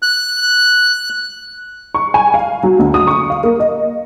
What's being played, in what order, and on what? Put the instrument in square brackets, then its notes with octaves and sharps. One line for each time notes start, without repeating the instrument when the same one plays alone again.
[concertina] F#6
[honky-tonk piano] C#6
G#5
F5
F#3
D2
D#6
C#6
F5
A#3
D#5